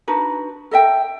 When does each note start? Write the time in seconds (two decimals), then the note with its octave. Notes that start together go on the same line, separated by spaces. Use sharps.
0.08 D4 D#4 F#4 B4
0.71 A4 D#5 E5 G5